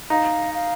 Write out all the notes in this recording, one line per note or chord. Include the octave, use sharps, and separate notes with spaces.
D#4 F5
F5